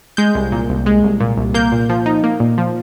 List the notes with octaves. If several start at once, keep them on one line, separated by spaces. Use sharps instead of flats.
G#3 G6
C2
A#2
C2
G#3
C2
A#2
C2
A#3 G6
A#2
F3
D#4
A#3
A#2
F3